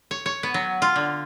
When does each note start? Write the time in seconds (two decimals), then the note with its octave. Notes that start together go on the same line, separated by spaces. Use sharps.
0.11 C#5
0.26 C#5
0.43 B3
0.54 F#3
0.82 F4
0.96 D3